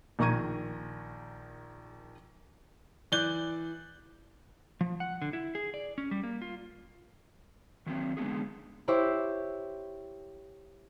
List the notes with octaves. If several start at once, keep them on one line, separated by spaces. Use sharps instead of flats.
A#1 D#3 A#5 C#6 G#6 D#7
E3 D5 F#6 G6 G7
F3
F#5
D3
E4
G#4
D5
C#4
G3
A#3
F4
D#3 F#3 B3 C4
D3 G#3 B3 F#4 G#4
E4 G4 C5 C#5 E5